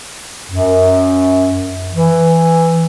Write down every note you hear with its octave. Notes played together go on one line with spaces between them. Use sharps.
F#2
E3